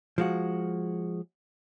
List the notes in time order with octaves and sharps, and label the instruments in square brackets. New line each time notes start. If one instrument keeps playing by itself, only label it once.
[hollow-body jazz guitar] F3 G#3 F#4